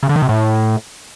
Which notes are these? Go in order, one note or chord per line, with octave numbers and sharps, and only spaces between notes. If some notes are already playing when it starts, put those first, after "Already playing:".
C#3
D3
D#3
C3
A2